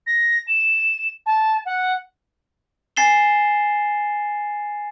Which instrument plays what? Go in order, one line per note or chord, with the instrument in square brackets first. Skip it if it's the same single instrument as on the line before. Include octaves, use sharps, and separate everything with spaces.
[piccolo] A#6
E7
A5
F#5
[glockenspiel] G#5 A6 C7 E7 G7